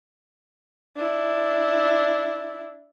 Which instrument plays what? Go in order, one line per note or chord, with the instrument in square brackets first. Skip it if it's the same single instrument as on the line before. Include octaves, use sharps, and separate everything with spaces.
[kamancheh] D4 E4